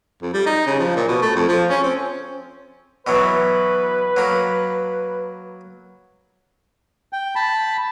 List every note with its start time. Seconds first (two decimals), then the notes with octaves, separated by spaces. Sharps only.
0.22 F2
0.34 G3
0.46 D#4
0.67 C#3
0.79 F3
0.96 A#2
1.08 B2
1.22 A3
1.35 F2
1.48 F3
1.70 C#4
1.83 C4
3.07 B2 E3 F#3 B4
4.16 F#3 A#3
7.13 G5
7.35 A5 B5